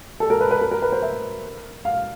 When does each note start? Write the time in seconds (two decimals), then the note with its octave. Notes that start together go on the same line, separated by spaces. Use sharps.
0.20 A4
0.30 A#4
0.41 B4
0.51 B4
0.61 A#4
0.71 A#4
0.82 B4
0.92 C5
1.02 E5
1.85 F5